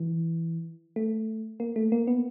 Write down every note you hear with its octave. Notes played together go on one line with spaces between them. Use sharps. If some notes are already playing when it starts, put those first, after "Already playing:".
Already playing: E3
A3
A#3
A3
A#3
B3